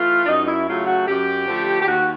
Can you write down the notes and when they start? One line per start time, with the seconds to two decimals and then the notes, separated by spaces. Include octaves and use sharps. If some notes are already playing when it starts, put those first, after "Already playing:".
Already playing: E3 A3 F4
0.23 D4
0.27 F#2 D#4
0.47 E4
0.67 C#3 F#3 A3 F4
0.86 F#4
1.07 F#2 G4
1.47 D3 F3 A3
1.81 G4
1.86 D#2 F#4